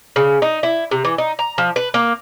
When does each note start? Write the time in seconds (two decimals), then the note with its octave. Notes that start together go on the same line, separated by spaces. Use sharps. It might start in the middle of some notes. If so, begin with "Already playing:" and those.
0.16 C#3
0.42 D#4
0.63 E4
0.91 C3
1.05 E3
1.18 D#4
1.39 A#5
1.58 F3
1.76 B4
1.94 A#3